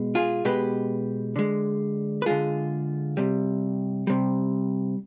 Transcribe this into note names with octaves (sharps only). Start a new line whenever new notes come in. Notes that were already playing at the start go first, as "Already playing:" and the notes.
Already playing: B2 G#3
F4 G#4
B2 G#3 G4 B4
D3 G#3
B4
D3 G#3 F4 G#4
C3 G3
C3 G3